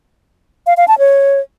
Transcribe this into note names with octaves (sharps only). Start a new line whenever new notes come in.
F5
F5
A5
C#5